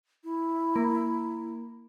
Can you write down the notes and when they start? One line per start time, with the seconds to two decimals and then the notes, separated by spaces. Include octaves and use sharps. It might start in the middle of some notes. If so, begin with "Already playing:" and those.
0.24 E4
0.76 A#3